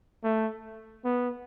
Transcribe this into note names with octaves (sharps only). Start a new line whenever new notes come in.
A3
B3